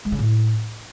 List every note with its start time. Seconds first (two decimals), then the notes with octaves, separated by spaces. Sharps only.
0.05 G#3
0.12 C#3
0.19 A2